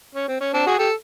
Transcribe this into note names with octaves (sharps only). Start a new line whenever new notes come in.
C#4
C4
C#4
C4 D4
F#4 G#4
G4 A4